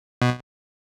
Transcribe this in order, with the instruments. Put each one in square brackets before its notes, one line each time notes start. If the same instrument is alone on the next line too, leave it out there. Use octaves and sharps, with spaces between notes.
[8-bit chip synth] B2